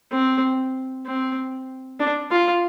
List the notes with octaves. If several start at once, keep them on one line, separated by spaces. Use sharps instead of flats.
C4
C4
D4
F4